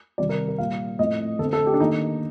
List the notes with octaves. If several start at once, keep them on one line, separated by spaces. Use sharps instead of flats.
C3 D#3 G3 D5
A#4
A#4
A#2 G3 A#3 F5
A2 F3 A3 C4 D#5
D3 A3 C4 A4
A4
G4
D4
D#3 A#3 D#4